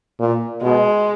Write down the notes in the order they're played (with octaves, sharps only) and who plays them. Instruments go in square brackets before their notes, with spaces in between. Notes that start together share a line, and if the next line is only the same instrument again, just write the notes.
[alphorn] A#2
[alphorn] B2 [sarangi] G#3